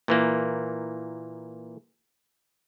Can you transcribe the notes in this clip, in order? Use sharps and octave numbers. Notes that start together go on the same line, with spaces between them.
A#2 E3 A#3